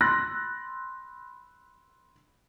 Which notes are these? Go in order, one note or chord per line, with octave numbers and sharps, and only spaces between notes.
B5 C6 E6 F#6 A6 A#6